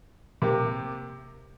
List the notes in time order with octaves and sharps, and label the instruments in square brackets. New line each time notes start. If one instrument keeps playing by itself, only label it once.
[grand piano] C3 A#3 G4